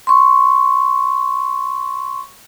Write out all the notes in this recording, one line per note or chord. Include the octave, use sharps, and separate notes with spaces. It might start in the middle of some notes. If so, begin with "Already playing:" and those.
C6 C#6